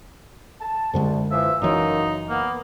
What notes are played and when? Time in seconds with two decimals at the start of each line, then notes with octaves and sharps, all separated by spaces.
0.61 A5
0.94 C2 F#2 D3 G#3
1.31 E3 F3 E5
1.62 F#1 F#2 E3 A#3 D#4
2.30 A#3 B3